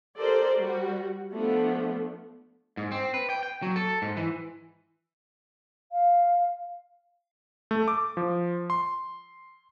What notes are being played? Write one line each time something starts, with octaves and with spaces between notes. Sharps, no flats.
G4 A4 A#4 C5 D5
G3 F#4
F3 A3 B3 D4
G#2
C4
B4
G5
G5
F#3
A4
G#2
E3
F5
A3
D6
F3
C6